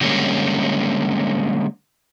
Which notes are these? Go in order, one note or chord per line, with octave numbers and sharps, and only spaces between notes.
D3 G3 G#3 A#3 C#4